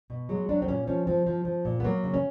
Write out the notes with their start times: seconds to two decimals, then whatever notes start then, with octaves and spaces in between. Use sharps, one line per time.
0.10 B2
0.29 F#3 G#3
0.49 F#3 D4
0.62 C4
0.68 A#2 C#4
0.87 F3 C#4
1.07 F3 C4
1.26 F3
1.45 F3
1.65 A#2
1.80 B3
1.84 F#3 A#3
2.04 C#3
2.14 C#4